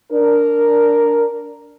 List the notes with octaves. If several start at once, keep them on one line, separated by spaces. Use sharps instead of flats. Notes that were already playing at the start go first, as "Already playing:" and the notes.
D4 A#4